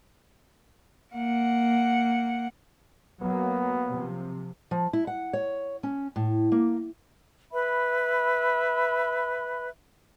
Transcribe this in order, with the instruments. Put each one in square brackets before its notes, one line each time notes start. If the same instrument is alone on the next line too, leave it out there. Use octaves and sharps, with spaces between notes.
[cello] A#3 F#5
[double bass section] F#3 A#3 [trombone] B3
[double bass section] C3 F3
[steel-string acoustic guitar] F3
E4
F#5
C#5
C#4
A2
A#3
[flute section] B4 E5 B5